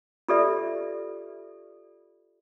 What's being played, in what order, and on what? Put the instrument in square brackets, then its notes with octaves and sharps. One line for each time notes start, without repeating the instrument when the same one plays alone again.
[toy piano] F4 G4 A4 B4 D5 E5